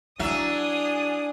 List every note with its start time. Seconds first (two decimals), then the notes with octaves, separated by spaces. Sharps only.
0.19 F#3 D4 E4 G#4 E5 D#6